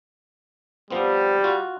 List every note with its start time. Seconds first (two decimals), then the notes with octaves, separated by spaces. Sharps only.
0.90 F3 G3 B3 C4
1.44 F4 F#4